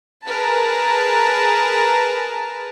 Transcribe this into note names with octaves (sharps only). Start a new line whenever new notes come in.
G#4 A#4 B4 A5